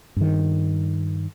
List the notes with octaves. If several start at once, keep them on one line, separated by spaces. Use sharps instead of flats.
G2 D#3